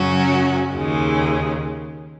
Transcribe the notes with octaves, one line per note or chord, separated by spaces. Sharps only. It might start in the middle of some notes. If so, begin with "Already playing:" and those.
Already playing: F#2 C#3 F#3 C#4 F#4
D#2 C#3 G#3